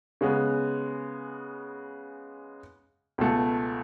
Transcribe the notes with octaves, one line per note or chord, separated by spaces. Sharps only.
C#3 G#3 B3
C#2 B2 A3